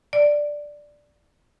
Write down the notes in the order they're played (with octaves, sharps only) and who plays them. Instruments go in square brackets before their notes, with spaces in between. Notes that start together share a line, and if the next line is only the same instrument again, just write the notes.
[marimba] D5